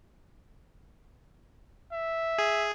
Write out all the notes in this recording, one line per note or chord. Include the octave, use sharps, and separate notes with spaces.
E5
G#4